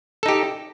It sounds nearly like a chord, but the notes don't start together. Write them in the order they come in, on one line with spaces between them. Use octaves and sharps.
A4 D#4 G4